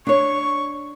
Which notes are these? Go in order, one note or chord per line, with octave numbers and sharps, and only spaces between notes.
D4 C#5 C#6